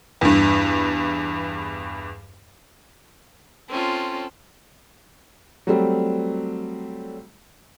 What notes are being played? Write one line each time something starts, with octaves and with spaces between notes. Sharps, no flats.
E2 G2
C4 C#4 F4 A4
F#3 G3 A3 C4